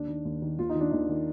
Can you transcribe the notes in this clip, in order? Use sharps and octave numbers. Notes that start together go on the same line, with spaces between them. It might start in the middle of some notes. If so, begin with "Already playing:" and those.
Already playing: D#2 D4
D#3
D#2
D#3
D#2 F4
D#4
D#3 D4
D#2 D#4
D#3